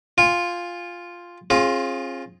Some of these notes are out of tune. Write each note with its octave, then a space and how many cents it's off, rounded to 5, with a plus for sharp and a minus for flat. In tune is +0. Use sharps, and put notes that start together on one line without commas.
F4 +0 G#5 -30
C4 +45 F4 +0 G#4 +0